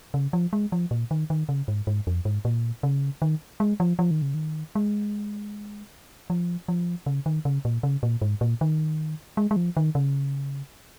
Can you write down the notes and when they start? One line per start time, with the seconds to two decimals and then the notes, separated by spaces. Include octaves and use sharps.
0.14 C#3
0.33 F3
0.53 G#3
0.72 F3
0.91 A#2
1.11 D#3
1.30 D#3
1.49 C#3
1.68 G#2
1.87 G#2
2.07 F2
2.25 G#2
2.45 A#2
2.83 C#3
3.22 D#3
3.60 G#3
3.80 F3
3.99 F3
4.11 D#3
4.22 C#3
4.34 D#3
4.75 G#3
6.30 F3
6.68 F3
7.06 C#3
7.26 D#3
7.45 C#3
7.65 A#2
7.83 C#3
8.03 A#2
8.21 G#2
8.41 A#2
8.61 D#3
9.37 G#3
9.51 G#3
9.56 F3
9.77 D#3
9.95 C#3